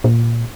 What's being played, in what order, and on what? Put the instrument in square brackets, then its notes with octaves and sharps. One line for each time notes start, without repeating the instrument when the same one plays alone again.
[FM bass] A#2